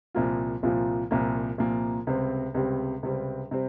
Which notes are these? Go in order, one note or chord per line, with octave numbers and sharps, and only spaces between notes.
C2 A#2 F3 A#3 F4
C2 A#2 F3 A#3 F4
C2 A#2 F3 A#3 F4
C2 A#2 F3 A#3 F4
C#2 C3 G3 C4
C#2 C3 G3 C4
C#2 C3 G3 C4
C3 G3 C4